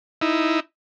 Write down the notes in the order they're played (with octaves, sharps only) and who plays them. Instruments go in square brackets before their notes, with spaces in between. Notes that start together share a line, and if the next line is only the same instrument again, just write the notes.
[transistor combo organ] D#4 E4